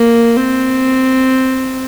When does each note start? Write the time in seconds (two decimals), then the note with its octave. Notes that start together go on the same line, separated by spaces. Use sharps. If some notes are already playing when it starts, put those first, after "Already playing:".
Already playing: A#3
0.37 C4